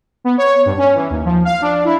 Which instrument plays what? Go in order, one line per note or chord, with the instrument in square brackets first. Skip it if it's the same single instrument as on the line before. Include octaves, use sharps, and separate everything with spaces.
[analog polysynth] B3
C#5
G2
C#4
E3
D#2
F3
F5
D4
E4